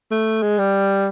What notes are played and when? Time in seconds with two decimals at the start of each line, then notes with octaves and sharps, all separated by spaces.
0.11 A3
0.42 G#3
0.58 G3